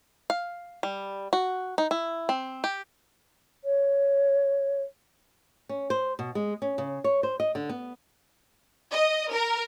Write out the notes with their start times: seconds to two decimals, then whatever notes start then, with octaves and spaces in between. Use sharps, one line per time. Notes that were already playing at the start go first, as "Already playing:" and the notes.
0.30 F5
0.83 G3
1.33 F#4
1.78 D#4
1.91 E4
2.29 C4
2.64 G4
3.64 C#5
5.69 C#4
5.90 C5
6.19 B2
6.35 G#3
6.62 C#4
6.78 C#3
7.04 C#5
7.23 C5
7.40 D#5
7.55 D3
7.69 B3
8.91 D#5
9.32 A#4